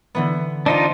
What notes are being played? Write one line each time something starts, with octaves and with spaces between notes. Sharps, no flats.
D3 E3 B3
D4 D#4 F4 C5 C6 B6